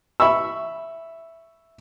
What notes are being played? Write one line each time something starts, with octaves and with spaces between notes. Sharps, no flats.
E5 B5 C#6 E6